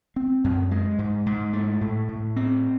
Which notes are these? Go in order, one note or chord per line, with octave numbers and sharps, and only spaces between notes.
C4
F#2
G#3
G#2
G#2
A3
A2
A2
C4